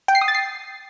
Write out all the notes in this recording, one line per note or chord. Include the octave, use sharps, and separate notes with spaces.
G5
C7
D#6
A6
C7